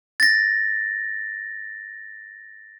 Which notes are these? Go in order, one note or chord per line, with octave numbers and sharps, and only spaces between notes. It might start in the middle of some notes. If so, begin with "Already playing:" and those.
A6 A#6